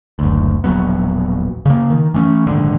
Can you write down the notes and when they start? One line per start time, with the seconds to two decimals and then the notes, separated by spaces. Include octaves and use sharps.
0.19 F#1 D2
0.64 E1 A#1 F#3 B3
1.66 C#3 A#3
1.90 D#3
2.14 E3 A3 C4 C#4
2.47 A#1 D#2 G#2 D3